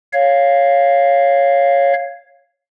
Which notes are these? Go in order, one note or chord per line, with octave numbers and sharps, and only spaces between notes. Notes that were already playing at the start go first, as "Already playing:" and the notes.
C#5 F5